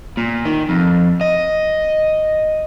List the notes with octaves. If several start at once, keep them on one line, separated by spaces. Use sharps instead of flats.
A#2
D#3
F2
D#5